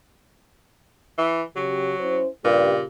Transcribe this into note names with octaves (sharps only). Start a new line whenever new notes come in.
E3
C#3 F#3 G4
C#4 E4 C5
G2 A#2 C#3 G4